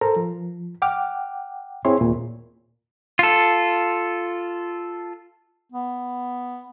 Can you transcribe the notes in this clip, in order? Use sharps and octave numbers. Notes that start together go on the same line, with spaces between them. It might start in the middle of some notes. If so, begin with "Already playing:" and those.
A4 A#4 C5 A#5
F3
F#5 G5 D6 F6
C4 E4 G#4 C#5 C6
D#2 A#2
F4 A4
B3